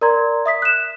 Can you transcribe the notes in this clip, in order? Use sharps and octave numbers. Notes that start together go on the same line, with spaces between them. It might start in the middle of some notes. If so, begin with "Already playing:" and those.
A#4 D5 A#5 C6 G#6
E5 D#6 B6
F#6 E7